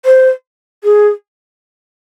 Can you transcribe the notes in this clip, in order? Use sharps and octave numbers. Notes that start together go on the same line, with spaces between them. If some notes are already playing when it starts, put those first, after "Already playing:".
C5
G#4